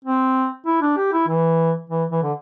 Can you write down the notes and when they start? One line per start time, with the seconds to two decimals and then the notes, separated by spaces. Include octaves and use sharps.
0.04 C4
0.66 E4
0.82 D4
0.97 G4
1.13 E4
1.28 E3
1.90 E3
2.11 E3
2.22 D3